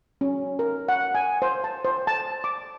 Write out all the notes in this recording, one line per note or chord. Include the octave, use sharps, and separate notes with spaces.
C#4
A#4
F#5
G#5
C5
A5
C5
A5
D6